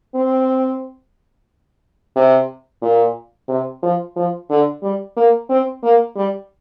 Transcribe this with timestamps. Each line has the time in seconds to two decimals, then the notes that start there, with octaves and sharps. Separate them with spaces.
0.15 C4
2.16 C3
2.82 A#2
3.49 C3
3.83 F3
4.16 F3
4.50 D3
4.82 G3
5.17 A#3
5.50 C4
5.83 A#3
6.16 G3